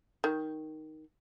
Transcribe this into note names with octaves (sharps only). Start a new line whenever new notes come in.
D#3